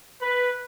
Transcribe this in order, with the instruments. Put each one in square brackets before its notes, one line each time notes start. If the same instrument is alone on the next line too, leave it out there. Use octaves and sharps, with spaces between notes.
[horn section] B4